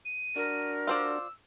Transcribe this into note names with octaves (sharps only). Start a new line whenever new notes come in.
D#7
D4 F#4 A#4
F4 C5 D5 E6